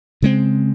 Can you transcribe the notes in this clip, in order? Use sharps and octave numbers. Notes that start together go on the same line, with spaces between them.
C#3 G#3 C4